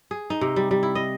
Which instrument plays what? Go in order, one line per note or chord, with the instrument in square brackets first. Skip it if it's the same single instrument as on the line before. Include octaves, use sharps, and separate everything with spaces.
[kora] G#4
D#4
C3
G3
G3
E4
D#5